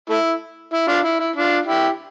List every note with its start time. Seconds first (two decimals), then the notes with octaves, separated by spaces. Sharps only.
0.10 A3 E4
0.73 E4
0.88 D4 F4
1.04 E4
1.20 E4
1.36 D4 F4
1.66 E4 G4